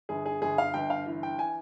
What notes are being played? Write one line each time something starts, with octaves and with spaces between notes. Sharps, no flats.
G1 G#4
G#4
G1 G#4
F5
G1 G5
F5
E3
G5
G#5